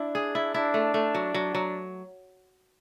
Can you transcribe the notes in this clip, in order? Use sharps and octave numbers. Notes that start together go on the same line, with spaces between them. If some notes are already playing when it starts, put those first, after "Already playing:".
Already playing: D4 E4
G#4
E4
D4 E4
A3
A3
F#3
F#3
F#3